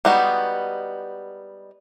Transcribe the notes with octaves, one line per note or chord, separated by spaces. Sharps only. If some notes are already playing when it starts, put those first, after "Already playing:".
G3 G#3 B3 D#4 F#4